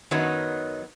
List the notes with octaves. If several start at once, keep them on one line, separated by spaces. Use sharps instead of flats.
F#2 D#3 F#3 B3 D#4